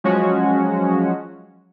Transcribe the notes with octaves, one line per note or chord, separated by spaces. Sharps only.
F3 F#3 G#3 C#4 F#4